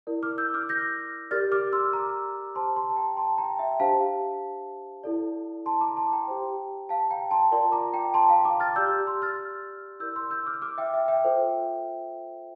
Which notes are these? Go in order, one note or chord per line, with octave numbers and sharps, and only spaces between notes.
E4 A#4 D5
D6 F6
E6 G6
D6 F6
G6 A#6
G4 A#4 D5 F6 A6
D6 F6
C6 E6
A#5 D6
G4 C5 A5 C6
A5 C6
A5
G5 A#5
A5 C6
G5 A#5
E5 G5
D4 G4 C5 F5 A5
E4 A4 D5
A5 C6
A#5 D6
A5 C6
G5 A#5
G4 C5
F5 A5
G5 A#5
A5 C6
F4 A#4 D5 A5 C6
A#5 D6
G5 A#5
A5 C6
F5 A5
A#5 D6
F6 A6
G4 D5 E6 G6
C6 E6
F6 A6
E4 A#4 D5 E6 G6
C6 E6
E6 G6
D6 F6
D6 F6
E5 G5
E5 G5
E5 G5
F4 A4 C5